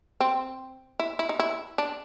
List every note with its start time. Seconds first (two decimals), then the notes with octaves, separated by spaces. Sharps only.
0.20 C4
0.99 E4
1.19 E4
1.29 D#4
1.39 E4
1.78 D4